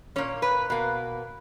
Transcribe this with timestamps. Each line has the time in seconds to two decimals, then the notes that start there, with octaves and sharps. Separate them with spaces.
0.16 A#2 A#3 C#4 C#5
0.42 B4
0.70 B2 A#3